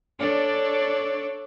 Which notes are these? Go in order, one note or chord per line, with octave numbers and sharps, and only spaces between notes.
D4 A4 C#5 D5